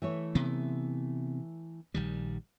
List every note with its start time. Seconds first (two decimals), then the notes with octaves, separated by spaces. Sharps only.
0.02 E3 A3 C#5
0.35 C3 B3
1.94 A#1 D#3 G3